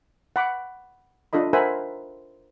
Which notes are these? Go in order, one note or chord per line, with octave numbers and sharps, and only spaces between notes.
F#5 B5 D6
D4 F4 A4 D#5 B5
A#4 C5 E5 F#5 G#5 B5